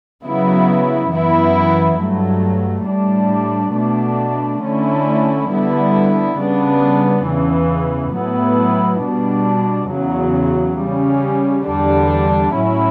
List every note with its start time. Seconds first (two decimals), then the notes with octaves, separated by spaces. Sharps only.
0.23 C#3 F#3 B3 E4
1.11 F#2 E3 B3 E4
1.99 G2 F#3 A3
2.87 A2 G3 D4
3.75 B2 A3 D4
4.63 D3 A3 C#4 E4
5.51 D3 G3 B3 E4
6.39 C#3 G3 B3 D4
7.27 E2 C#3 E3
8.15 A2 F#3 B3 E4
9.02 B2 G3 D4
9.91 E2 C#3 F#3
10.79 C#3 G3 C#4
11.67 E2 D3 G3 D4
12.55 A2 F#3 C#4 E4